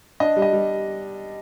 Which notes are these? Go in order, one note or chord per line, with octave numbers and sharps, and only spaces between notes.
D4 D#5
G3
D#5
G3